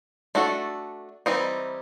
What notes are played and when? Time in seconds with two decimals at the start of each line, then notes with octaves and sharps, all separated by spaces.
0.35 A3 D4 F#4 A4
1.26 E3 G3 C4 D#4